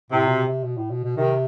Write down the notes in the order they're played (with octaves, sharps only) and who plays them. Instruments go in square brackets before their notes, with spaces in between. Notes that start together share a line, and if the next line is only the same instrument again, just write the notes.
[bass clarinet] A2 [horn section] C3
[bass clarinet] B2
C3
B2
A2
B2
B2
[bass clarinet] C3 [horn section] D#3